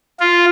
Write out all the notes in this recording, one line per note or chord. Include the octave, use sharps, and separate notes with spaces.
F4